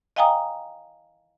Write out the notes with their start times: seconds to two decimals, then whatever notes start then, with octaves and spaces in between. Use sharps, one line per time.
0.16 D#5 F5 G5 G#5 A#5 D#6